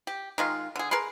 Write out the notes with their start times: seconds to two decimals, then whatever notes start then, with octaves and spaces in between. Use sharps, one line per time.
0.07 G4
0.38 D#3 G#3 F4
0.76 D3 G#4
0.91 G#4 A#4 B4 C6